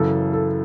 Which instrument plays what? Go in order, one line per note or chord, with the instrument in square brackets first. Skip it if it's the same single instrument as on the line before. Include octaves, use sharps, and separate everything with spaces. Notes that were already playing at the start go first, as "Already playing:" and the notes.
Already playing: [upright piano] F#2 C#3 E3 [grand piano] A4
[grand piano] A4